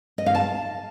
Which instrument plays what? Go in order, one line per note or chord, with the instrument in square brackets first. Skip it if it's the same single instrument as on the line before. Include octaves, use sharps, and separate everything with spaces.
[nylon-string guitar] D#5
F5
A5